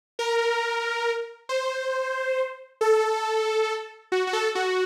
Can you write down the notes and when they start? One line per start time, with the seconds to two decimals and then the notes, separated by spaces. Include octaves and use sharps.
0.19 A#4
1.49 C5
2.81 A4
4.12 F#4
4.27 F#4
4.33 A4
4.55 F#4